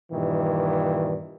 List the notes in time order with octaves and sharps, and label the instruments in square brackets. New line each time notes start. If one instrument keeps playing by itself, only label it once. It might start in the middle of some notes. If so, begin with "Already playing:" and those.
[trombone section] G2 A#2 D#3 E3